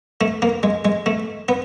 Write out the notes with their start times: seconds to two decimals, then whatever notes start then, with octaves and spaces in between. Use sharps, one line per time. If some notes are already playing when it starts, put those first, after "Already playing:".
0.21 A3
0.42 A#3
0.63 G#3
0.85 G#3
1.06 A3
1.49 B3